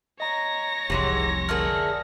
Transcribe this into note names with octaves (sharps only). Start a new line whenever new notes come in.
C#5 D#5 A#5 A#6
F1 C2 E3 F#3 G#3 G4 C6
D3 A3 G#4 A#4 F6